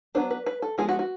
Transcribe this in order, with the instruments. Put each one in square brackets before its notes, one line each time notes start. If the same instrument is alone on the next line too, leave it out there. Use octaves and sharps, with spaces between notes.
[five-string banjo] F#3 B3 D4 C5
B4
B4
A4
F3 G#3 B3 G#4
F#4
F#4